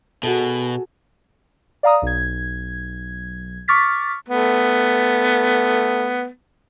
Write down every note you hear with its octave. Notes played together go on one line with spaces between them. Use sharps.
B2 F#4 G#4 A4
D5 F5 A#5 D#6
B1 G#6
C#6 D6 F6 A6 B6
A3 B3